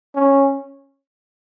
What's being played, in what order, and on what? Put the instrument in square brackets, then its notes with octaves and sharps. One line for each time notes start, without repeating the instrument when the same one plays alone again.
[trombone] C#4